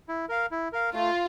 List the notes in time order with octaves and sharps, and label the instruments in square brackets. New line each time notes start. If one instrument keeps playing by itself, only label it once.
[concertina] E4
A#4 F5
E4
A#4 F5
[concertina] A3 [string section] F4